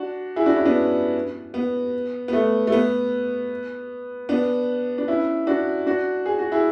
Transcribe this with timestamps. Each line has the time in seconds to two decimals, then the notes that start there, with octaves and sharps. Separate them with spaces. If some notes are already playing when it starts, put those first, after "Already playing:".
Already playing: D4 F#4
0.36 E4 G#4
0.46 D4 F#4
0.56 C#4 E4
0.65 B3 D4
1.54 B3
2.28 B3
2.33 A3
2.67 A3
2.72 B3
4.29 B3 D4
4.98 D4
5.08 C#4 E4
5.47 D4 F#4
5.86 D4 F#4
6.26 G#4
6.39 F#4
6.52 E4 G#4